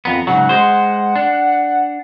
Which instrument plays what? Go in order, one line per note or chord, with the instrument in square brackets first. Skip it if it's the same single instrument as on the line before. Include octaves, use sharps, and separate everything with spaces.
[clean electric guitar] F2 B3 [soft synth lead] A#5
[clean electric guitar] G#2 C#3 F#3 [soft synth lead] F#5
[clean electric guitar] G#3 C5
D4